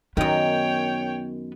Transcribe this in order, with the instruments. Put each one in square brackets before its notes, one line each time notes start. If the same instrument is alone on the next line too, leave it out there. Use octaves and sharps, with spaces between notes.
[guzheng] F#2 D#3 [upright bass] B3 [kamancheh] C#5 G5